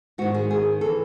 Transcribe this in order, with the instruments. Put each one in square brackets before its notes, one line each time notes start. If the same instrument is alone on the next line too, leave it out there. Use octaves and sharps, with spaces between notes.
[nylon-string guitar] G#2 D#3 F#4
G#4
G#4
E3 A4